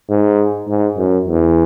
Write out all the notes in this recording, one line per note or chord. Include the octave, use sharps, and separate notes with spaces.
G#2
G#2
F#2
E2